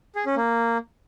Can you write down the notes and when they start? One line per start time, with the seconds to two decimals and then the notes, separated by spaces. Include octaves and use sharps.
0.15 G#4
0.26 C#4
0.36 A#3